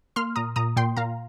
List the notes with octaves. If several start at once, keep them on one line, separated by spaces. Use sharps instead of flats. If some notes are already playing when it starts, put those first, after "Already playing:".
A#3 C6 F6
A#2 A#5 D#6
A#2 A#5 D#6
A#2 G5 C6
A#2 F5 A#5